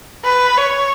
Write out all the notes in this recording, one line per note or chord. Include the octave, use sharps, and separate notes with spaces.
B4
C#5